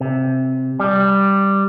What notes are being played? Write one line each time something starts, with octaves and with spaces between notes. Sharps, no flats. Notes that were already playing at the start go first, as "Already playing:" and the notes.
C3
G3